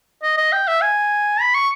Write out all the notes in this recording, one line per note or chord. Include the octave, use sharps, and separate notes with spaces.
D#5
D#5
G5
E5
G#5
B5
C#6